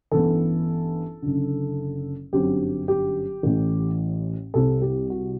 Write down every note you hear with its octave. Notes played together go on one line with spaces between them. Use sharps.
A1 G2 E3 B3 A4
F#1 F#2 D3
G1 F#2 D3 F#3 C4 G4
G4
A1 A2 E3 A3
C2 C3 G3 C4 A4
G4
F#4